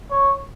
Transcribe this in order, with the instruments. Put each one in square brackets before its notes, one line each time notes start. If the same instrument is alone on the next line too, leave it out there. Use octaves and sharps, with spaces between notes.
[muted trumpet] C#5